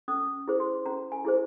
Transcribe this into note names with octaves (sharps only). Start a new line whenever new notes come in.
C#4 D#6
E4 G#4 C5
C6
C#4 A#5
G#5
E4 G#4 C5